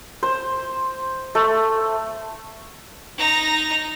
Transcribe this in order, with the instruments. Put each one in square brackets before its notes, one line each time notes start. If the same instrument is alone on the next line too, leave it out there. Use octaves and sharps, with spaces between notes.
[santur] C5
A3
[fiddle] D#4 A#5